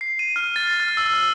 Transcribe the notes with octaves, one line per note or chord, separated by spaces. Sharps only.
C7
D#7
F6
A6
F6
E6
E6